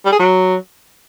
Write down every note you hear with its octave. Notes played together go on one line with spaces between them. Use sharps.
G3
G#4
F#3